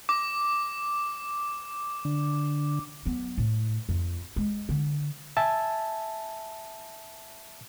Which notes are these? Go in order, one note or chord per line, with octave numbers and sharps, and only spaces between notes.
D6
D3
F#3 B3
A2
F2
G#3
D3
E5 G#5 A5